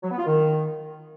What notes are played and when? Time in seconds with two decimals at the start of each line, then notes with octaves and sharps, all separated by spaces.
0.03 F#3
0.11 B3
0.19 F4
0.26 D#3